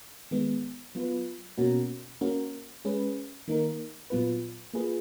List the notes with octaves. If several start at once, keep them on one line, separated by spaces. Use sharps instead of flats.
D#3 G#3 B3
F#3 B3 F4 B4
B2 A#3 C#4 F#4 A#4
A#3 C#4 F#4 A#4
G#3 C#4 G#4 B4
D#3 A#3 D#4 A#4
A#2 F#3 B3 F4 B4
A#3 F4 G#4 B4